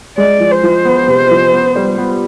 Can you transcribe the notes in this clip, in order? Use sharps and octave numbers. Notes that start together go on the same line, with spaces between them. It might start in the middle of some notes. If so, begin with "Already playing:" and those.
G#3 D5
F3
C5
F3
B3
C3
F3
B3
G3
B3